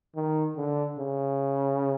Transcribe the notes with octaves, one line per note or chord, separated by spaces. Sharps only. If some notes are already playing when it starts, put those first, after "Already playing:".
D#3
D3
C#3